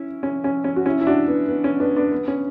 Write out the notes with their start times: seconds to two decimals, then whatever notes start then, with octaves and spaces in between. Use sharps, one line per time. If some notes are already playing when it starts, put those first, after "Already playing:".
Already playing: C#4 E4
0.23 C#4
0.44 C#4
0.64 C#4
0.76 F#4
0.86 C#4 E4
1.01 E4
1.07 D4 F#4
1.28 B3
1.48 B3
1.64 C#4
1.80 B3 D4
1.96 B3 D4
2.12 B3
2.28 C#4